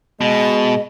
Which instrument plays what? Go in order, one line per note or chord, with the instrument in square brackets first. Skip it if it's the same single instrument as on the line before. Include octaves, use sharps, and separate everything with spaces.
[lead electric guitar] B2 [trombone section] G#3 [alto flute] D#5